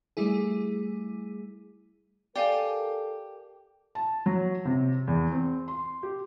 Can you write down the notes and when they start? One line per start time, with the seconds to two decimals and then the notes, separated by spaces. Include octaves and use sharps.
0.17 G3 A3 E4 G#4
2.36 G4 A4 A#4 D5 F5 G#5
3.95 A5
4.26 F#3
4.65 C3
5.07 E2
5.32 C4
5.68 C6
6.03 G4